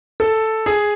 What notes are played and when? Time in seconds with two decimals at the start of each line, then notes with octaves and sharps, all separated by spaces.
0.20 A4
0.66 G#4